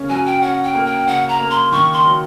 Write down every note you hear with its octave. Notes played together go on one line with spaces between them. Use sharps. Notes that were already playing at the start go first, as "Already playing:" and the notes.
Already playing: C#3 A#3 C#4
F#3 G#5
G5
C#4 F#5
G5
A#3
G5
C#3 F#5
A#5
A#3
C6
D#3 C#6
C6
F#3